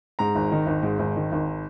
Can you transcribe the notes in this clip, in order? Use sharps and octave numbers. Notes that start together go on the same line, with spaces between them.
G#2 A#5
G#1
D#3
G#1
G#2
G#1
D#3
G#1